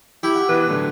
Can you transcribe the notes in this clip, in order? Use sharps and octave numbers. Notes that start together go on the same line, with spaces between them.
E4 G4 E5
F#5
B2 E3 B4
A2 D3 F#3